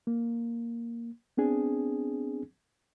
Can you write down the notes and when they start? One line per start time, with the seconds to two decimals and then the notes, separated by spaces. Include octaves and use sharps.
0.07 A#3
1.37 B3 C4 D4 G#4